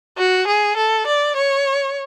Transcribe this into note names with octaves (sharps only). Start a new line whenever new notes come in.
F#4
G#4
A4
D5
C#5